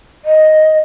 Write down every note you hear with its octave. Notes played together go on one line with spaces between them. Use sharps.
D#5